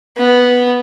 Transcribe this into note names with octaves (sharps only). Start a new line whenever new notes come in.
B3